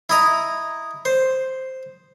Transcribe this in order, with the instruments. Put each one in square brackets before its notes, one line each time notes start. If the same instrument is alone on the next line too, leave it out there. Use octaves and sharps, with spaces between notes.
[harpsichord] E4 D#5 A#5
C5